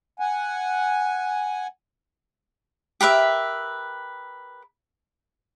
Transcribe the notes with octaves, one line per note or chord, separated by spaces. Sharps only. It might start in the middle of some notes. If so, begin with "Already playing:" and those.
F#5 G#5
G4 A#4 B4 E5